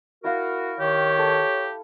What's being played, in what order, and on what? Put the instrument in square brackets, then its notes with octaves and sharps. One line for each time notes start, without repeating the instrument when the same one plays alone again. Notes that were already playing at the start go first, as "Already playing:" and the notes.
[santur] E4 F5 [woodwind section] F#4 A#4
[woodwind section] D#3 [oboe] G4 [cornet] C#5
[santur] A4